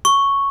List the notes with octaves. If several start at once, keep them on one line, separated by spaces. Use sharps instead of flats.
C#6